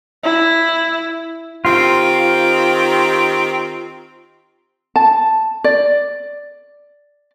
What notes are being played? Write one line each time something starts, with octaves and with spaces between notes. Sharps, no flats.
E4
D#3 C4 F4 G4
A5
D5